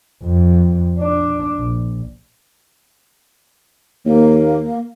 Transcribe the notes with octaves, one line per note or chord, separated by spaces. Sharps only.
F2
D4
A#1
D#2 A#3